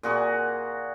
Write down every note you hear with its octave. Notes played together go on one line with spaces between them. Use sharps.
A#2 F#4 G#4